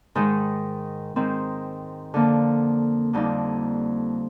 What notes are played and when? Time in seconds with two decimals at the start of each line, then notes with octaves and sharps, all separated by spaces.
0.15 G#2 D#3 G#3
1.16 G#2 D#3 G#3 C4
2.14 F2 D3 F3 A#3 D4
3.13 F2 D3 G3 A#3 D#4